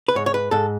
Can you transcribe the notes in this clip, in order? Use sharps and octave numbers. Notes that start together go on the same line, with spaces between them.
B4
G#2 C#5
C#5
B4
G#2 A4